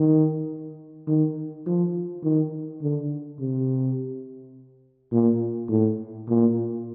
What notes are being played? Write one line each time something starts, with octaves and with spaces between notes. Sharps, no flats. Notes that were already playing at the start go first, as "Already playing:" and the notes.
Already playing: D#3
D#3
F3
D#3
D3
C3
A#2
A2
A#2